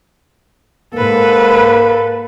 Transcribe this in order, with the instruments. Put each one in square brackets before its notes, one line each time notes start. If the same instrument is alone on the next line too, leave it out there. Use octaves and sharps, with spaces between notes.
[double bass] G#2 [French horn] A#3 [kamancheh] A4 B4